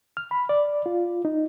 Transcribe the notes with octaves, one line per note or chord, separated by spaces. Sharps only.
F6
B5
D5
F4
D#4